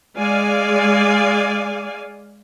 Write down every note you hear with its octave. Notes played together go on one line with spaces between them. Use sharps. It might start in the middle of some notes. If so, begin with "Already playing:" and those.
G#3 D5 F5 G#5